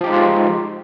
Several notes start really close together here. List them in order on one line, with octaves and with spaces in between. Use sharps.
F3 G4 D#4 G#3 F4